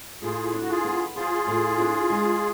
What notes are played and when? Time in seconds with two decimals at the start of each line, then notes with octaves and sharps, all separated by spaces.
0.22 A2 F4 G#4
0.53 D4
0.62 F#4
0.69 F4 G#4
0.84 B3
1.16 F3 F4 G#4
1.47 A2
1.79 D4
2.10 G#3